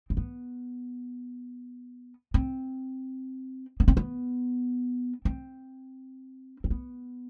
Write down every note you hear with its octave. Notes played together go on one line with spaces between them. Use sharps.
C4
B3
C4
B3
C4
B3
C4
C4
B3